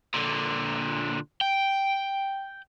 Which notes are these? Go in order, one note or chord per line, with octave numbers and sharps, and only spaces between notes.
A#2 D3
G5